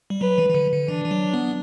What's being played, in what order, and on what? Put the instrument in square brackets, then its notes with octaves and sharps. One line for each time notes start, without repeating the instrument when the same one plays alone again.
[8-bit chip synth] G3
[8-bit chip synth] F#3 [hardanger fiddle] B4
[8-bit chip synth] E3
E3
D3
D3
[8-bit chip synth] E3 [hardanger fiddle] D4
[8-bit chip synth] E3
F#3
B3